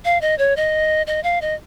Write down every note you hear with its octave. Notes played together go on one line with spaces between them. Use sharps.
F5
D#5
C#5
D#5
D#5
F5
D#5